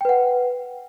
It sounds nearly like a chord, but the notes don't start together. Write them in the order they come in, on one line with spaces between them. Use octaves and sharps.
G5 B4 F#5